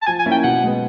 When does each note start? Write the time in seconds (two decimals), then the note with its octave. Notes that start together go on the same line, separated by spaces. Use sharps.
0.02 A5
0.06 F3 G#5
0.20 G#5
0.26 A#3 C#4 E4
0.31 G5
0.44 B2 F#5
0.63 G#3 B3